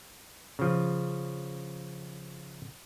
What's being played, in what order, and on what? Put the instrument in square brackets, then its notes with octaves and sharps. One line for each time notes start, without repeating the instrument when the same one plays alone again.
[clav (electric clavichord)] C#3 F3